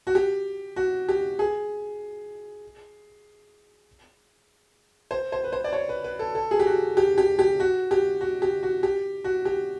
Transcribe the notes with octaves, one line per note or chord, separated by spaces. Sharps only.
F#4
G4
F#4
G4
G#4
C5
C5
B4
C5
D5
C#5
B4
B4
A4
A4
G#4
G4
F#4
G4
G4
G4
F#4
G4
F#4
G4
F#4
G4
F#4
G4